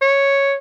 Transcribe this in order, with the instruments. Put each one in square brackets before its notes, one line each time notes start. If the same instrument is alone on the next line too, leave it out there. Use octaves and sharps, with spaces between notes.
[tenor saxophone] C#5